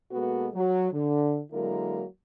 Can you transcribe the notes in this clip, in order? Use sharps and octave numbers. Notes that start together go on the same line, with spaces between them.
B2 G#3 A#3 B3 F#4 A4
F#3
D3
D3 F#3 G#3 A#3 E4 A#4